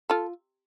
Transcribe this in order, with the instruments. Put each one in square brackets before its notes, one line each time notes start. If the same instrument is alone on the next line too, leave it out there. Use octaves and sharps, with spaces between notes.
[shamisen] F4 A4